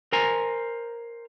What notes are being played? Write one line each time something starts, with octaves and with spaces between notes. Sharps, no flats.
A#4 C5 G#5 A#5